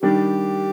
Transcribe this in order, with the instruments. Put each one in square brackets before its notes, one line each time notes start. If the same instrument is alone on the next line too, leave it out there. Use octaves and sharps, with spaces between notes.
[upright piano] D#3 G3 D4 [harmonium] G4